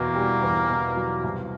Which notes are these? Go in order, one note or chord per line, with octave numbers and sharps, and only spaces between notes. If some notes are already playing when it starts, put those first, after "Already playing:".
Already playing: E2 B2 A#3
G3
E2
B2
F#3
C2